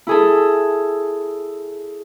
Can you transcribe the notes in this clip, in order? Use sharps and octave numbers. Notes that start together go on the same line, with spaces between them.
E4 G#4 A4